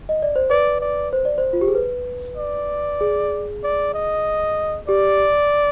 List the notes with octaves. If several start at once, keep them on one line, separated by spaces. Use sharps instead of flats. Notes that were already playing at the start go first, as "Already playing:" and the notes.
D#5
D5
C5
B4 D5
D5
C5
D5
C5
F4
G4
G#4
B4
D5
G#4
D5
D#5
G4 D5